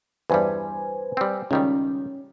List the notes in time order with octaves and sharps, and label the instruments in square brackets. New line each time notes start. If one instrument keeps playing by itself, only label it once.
[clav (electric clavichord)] E2 G2 G3 [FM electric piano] B4 C5 G#5
[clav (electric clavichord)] G3 C4
[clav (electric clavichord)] C#2 D#3 G3 [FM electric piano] C#4